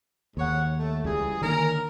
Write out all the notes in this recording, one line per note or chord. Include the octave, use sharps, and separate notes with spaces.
D#2 G#2 C#5 F#5
A3
C#2 C#3 E3 G3 G#4
D3 D#3 A#3 C#4 A#4